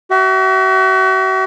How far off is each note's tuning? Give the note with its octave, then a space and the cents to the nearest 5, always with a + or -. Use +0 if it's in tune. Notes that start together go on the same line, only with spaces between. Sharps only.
F#4 +40 E5 +0